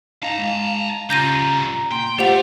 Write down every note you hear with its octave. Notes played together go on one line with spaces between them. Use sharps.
D#4 F5 A5 A#5
G#2
C#3 G3 F4 A#5 G6 A#6 D#7
A#2 G5 C6
A3 F4 G4 C5 F5 F#5 F7